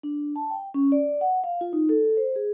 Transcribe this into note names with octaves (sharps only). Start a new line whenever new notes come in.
D4
A5
G5
C#4
D5
F#5
F5
F4
D#4
A4
C5
G#4